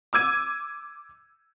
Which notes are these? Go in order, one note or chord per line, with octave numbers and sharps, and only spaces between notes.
D6 E6 G#6 D#7